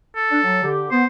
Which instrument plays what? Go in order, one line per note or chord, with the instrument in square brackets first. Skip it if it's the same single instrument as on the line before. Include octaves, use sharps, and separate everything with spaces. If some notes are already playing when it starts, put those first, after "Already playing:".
[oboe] A4
[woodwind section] D4
F#3
D3 G4
[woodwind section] B3 [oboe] C5